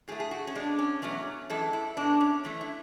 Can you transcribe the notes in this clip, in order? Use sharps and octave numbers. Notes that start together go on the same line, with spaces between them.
A2 F#3 A3 G#4
G#4
F#4
C#4
B2 G#3 D4
C#4
E2 B2 F#3 A3 C#4
F#2 E3 G#3 A4
E4
B2 G#3 D4
C#4
F#2 E3 A3 C#4
E4